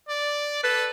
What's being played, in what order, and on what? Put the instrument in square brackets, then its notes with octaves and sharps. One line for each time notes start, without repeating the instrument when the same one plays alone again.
[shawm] D5
[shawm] A4 [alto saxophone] B4